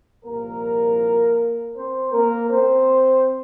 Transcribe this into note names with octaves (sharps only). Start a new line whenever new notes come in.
C2 A#2 F3 A#3 A#4
C4 C5
A#3 A#4
C4 C5